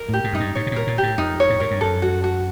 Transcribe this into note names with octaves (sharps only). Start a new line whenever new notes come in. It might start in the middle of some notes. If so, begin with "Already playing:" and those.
Already playing: A#4
A2 G4
G#2
F#2 D#4
G2
A2 C#5
B2
A#2 A#4
A#2
A2 G4
F2 D#4
C#5
A2
G#2 A#4
G2
F#2 A4
F#4
F#4